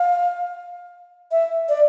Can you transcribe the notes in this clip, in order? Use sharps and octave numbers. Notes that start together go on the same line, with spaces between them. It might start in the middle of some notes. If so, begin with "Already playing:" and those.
Already playing: F5
E5
D5